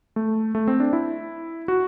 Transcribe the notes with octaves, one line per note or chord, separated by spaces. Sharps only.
A3
A3
C4
D4
E4
F#4